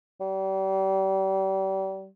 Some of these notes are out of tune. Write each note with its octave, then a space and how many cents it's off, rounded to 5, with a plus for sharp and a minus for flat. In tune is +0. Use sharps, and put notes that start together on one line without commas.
G3 -35